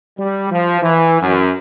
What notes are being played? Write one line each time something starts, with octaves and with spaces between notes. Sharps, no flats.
G3
F3
E3
F#2